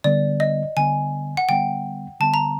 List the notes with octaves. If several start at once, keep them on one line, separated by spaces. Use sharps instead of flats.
D3 G3 B3 D5
D#5
D3 G3 B3 G#5
F#5
D3 G3 B3 G5
D3 G3 B3 A5
A#5